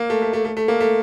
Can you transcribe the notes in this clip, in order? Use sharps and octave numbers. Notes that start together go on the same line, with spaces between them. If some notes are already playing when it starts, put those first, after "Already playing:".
Already playing: A#3
A3
A3
A3
A3
A3
A#3
A3